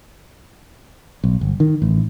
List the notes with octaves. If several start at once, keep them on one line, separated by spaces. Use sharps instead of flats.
B1
G1
D#3
A1